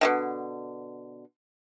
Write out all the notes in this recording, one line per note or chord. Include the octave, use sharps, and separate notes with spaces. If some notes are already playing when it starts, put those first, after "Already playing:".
B2 D3 D#3